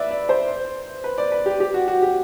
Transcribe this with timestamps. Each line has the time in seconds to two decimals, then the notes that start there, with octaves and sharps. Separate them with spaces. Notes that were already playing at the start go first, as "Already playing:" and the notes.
Already playing: B4 D5 E5
0.11 D5
0.29 C5
1.04 B4
1.18 D5
1.32 B4
1.46 G4
1.60 G4
1.74 F#4
1.88 F#4
2.02 G4